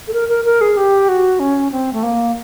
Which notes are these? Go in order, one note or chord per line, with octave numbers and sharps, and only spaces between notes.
A4
A#4
A#4
A#4
G#4
G4
F#4
C#4
C4
A3
A#3